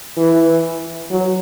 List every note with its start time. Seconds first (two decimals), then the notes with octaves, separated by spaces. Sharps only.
0.17 E3
1.11 F#3